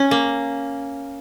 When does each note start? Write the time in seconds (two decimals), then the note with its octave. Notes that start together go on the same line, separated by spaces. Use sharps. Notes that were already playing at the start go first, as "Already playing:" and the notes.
Already playing: C#4
0.11 A#3